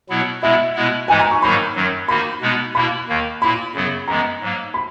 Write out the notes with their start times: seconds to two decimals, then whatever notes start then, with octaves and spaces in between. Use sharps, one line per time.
0.09 B2 F#3 B3 E4
0.42 B2 G#3 B3 E4 E5
0.75 B2 G#3 B3 E4
1.08 G#2 E3 G#3 D#4 G#5
1.20 A#5
1.31 C#6
1.42 G#2 D#3 F#3 A#3 D#4 B5
1.75 F#2 D#3 F#3
2.08 D#3 A#3 D#4 F#4 B5
2.41 B2 G#3 B3 D#4
2.75 B2 A#3 E4 B5
3.08 D#2 D#3 A#3
3.42 A#2 A#3 E4 B5
3.74 F#2 C#3 F#3 B3
4.07 F#2 E3 G#3 B3 A#5
4.41 G#2 F#3 A#3
4.74 B5